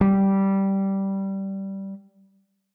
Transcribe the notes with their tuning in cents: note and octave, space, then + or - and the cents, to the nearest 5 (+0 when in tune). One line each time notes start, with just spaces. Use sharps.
G3 -10